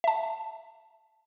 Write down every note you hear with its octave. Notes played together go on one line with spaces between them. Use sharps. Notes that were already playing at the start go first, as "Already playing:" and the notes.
E5 A5